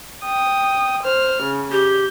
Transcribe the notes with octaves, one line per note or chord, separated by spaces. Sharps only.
G5 D#6
C5 F6
C#3
G4 G6